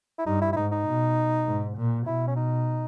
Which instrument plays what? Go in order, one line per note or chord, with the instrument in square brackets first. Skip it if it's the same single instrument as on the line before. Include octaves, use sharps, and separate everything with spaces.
[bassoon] E4
[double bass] G2 [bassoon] D#4
[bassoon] E4
E4
[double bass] G#2 [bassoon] D#4
[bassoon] D#4
[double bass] B2
G#2
A#2
[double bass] B2 [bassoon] E4
[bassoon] C#4
D#4